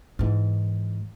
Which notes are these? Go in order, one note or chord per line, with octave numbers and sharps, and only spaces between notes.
G#2 E3